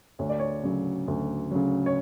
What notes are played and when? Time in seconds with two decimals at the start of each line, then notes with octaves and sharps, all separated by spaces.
0.19 D2 C#5
0.30 D5
0.40 C#5
0.63 C#3 F#3
1.08 D2
1.51 C#3 F#3
1.86 C#5